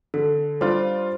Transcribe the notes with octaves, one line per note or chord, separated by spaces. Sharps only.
D3 A4
G3 D4 F4 C5